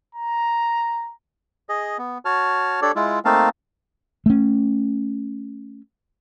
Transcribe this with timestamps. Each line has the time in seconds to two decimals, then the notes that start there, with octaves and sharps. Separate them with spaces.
0.15 A#5
1.69 G#4 D#5
1.98 B3
2.25 F#4 C#5 A5 F6
2.82 D4 G4 A4 C#5 D5
2.96 G#3 E4 F4
3.25 A3 A#3 C4 D#4 F5 A5
4.26 A3 C#4